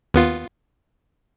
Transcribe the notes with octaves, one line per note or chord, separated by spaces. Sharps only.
D#2 B3 F4